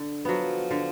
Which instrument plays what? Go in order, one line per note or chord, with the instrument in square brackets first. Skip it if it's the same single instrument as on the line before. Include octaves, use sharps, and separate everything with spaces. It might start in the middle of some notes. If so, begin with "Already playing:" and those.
Already playing: [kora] D3
[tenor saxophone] F3 [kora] F#3 B3
[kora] D3